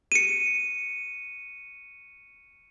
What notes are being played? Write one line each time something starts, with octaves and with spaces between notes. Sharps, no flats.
C#7 D#7